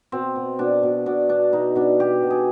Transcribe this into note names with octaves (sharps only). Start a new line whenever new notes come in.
B2 C4
B2
B2 D4
B2
B2 D4
B2 D4
B2 D#4
B2 D4
B2 G4
B2
G#4